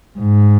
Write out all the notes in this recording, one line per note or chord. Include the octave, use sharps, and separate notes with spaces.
G#2